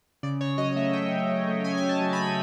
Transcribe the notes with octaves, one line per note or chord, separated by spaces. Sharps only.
C#3 D5
C#3 C#5
F#3 D#5
A3 E5
C#3 G5
C#3
F#3
A3
C#3 G#5
C#3 G#5
A5
F#3
B5
A3